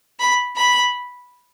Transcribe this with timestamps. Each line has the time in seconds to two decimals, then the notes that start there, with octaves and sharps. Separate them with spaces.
0.19 B5
0.56 B5